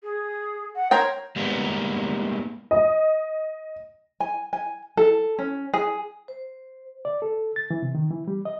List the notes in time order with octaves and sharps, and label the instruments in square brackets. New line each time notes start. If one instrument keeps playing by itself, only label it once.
[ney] G#4
F#5
[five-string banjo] A#4 C5 G5 [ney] C#5
[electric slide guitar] G3 G#3 A#3 B3 D#4
[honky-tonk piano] D#5
[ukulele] G#5
G#5
A4
C#4
G#4
[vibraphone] C5
[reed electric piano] D5
A4
A6
E3
C3
D#3
E3
G3
D#5